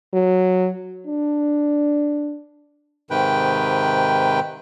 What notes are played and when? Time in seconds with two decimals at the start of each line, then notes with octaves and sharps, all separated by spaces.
0.13 F#3
1.07 D4
3.11 G#2 C3 D#3 B4 G5